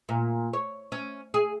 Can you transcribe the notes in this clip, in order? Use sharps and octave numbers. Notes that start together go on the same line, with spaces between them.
A#2
C#5
C#4
G#4